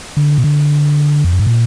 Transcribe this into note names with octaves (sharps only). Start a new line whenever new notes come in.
D3
B2
D3
F2
F#2
G#2
A#2